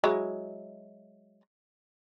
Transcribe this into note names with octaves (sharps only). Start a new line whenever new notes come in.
F#3 G#3 E4